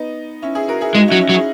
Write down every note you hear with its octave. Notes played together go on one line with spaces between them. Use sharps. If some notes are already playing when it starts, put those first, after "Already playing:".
Already playing: B3 D#4
C#4 E4
E4 G#4
F#4 A#4
E4 G#4
G#3 D#4 F#4
F#3 C#4 E4
C#4 E4
F#3
E4 G#4